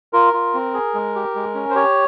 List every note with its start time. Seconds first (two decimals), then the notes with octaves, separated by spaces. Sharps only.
0.13 F4 A#4
0.33 F4
0.54 C4
0.74 G#4
0.94 G#3
1.15 G4
1.35 G#3
1.55 C#4
1.70 C5
1.75 G4 C#5